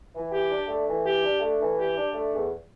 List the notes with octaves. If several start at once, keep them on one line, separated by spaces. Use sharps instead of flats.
E3
G4
D4
A3
E3
G4
D4
A3
E3
G4
D4
A3
E2